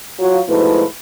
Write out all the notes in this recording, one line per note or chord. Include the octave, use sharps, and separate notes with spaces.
F#3 F4
G#2 B2 F3 A3 E4 B4